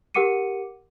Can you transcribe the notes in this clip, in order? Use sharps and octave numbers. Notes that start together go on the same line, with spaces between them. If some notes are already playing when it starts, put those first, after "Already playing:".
G4 A#4 F#5 D6 C#7 D#7